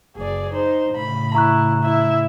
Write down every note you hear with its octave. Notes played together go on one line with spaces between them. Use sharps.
F#1 G#4 D5
D#4 C5
A2 C#3 B5
E4 A#5 C#6 F#6
E4 E5